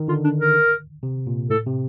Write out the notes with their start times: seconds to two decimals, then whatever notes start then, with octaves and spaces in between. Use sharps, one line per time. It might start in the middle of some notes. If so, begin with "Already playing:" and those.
Already playing: D#3
0.08 D3 F4
0.24 D4
0.40 A#4
1.03 C3
1.27 A#2
1.50 A2 A4
1.66 C3